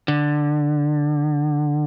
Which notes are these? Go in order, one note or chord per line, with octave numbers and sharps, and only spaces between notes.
D3